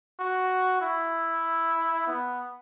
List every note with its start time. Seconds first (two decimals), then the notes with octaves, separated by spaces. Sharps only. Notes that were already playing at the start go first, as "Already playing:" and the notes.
0.19 F#4
0.81 E4
2.07 B3